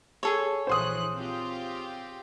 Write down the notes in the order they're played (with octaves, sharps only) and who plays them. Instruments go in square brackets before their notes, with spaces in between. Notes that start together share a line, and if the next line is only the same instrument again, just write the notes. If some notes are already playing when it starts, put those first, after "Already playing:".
[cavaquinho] G#4 A4 C#5
[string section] A#1 E3 F#6 [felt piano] C5 C6 D#6
[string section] C4 F4 G4